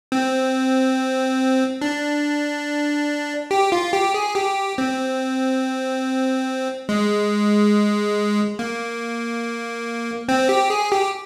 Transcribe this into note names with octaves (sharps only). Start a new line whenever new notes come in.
C4
D4
G4
F4
G4
G#4
G4
C4
G#3
A#3
C4
G4
G#4
G4